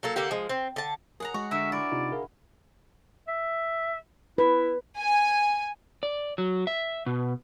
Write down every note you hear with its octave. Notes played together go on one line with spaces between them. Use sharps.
F#3 A#3 A4
D3 A#3 F#4 G4
F3 G#3
C4
D3 A5
G#4 A#4 F#5 A#5
G#3 F#4 C#6
D3 A#4 E5
E4 D5
C3 D#4 F4
G#4 A#4 F5
E5
E4 B4
G#5
D5
F#3
E5
B2